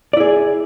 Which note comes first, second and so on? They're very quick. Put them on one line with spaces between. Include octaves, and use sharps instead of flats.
D5 E4 G#4